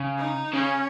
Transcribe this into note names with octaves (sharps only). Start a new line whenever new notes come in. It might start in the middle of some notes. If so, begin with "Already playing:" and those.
Already playing: C#3
D#4
C#3 C#4